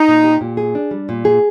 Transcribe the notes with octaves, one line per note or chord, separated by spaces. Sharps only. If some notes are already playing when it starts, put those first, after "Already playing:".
Already playing: D#4
A#2
G4
A#2
G#4
D4
G3
A#2
G#4